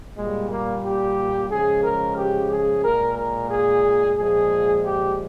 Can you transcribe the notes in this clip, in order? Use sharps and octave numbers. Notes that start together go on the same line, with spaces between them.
A#2 G3 G#3
A#3
G4
C#3 F3 G#3 G#4
A#4
G4
G#4
A#2 G#3 A#4
A#4
G#4
A#2 F3 G#3 G#4
G4